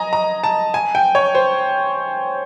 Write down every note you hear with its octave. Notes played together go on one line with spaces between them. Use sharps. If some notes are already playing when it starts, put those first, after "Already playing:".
Already playing: D#5 G#5 A#5
A#5
A5
G#5
G5
C#5
C5